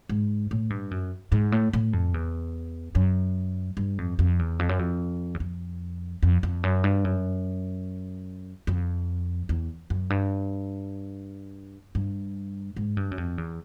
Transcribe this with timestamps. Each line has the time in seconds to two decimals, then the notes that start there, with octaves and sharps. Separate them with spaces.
0.09 G#2
0.51 A2
0.70 G2
0.91 F#2
1.32 G#2
1.52 A2
1.73 A2
1.93 F2
2.14 E2
2.95 F#2
3.77 G2
3.98 F2
4.19 F2
4.39 E2
4.59 F2
4.69 F#2
4.79 F2
5.34 E2
5.40 F2
6.23 F2
6.43 F2
6.63 F#2
6.84 G2
7.04 F#2
8.67 F2
9.49 E2
9.90 F#2
10.10 G2
11.95 G2
12.76 G#2
12.97 G2
13.11 F#2
13.18 F2
13.38 E2